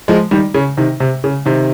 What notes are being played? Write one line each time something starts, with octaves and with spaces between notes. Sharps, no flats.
F3 G#3
D#3 G3
C#3
C3 D#3
C3
C#3
C3 D#3